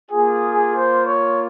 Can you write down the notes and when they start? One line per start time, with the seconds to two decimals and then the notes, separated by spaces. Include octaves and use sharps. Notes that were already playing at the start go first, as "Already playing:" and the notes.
0.11 A#3 F4 G#4
0.75 C5
1.06 C#5